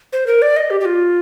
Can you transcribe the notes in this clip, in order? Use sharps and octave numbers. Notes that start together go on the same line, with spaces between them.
C5
A#4
D5
D#5
G4
G4
F4